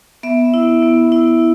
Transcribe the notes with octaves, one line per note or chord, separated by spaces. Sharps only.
B3 E5
E4
B3
E4